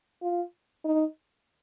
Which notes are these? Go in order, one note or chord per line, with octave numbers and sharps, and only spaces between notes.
F4
D#4